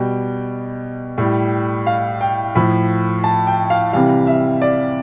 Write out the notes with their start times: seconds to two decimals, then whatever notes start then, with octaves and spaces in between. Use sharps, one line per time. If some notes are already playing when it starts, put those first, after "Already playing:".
Already playing: B2 G3 G5
1.18 A2 G3
1.87 F5
2.21 G5
2.55 A2 F3 B5
3.24 A5
3.47 G5
3.70 F5
3.93 C3 E3 G3 F5
4.27 E5
4.62 D5